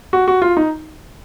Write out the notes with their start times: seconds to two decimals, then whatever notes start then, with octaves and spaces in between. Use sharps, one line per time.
0.13 F#4
0.28 F#4
0.42 F4
0.57 D#4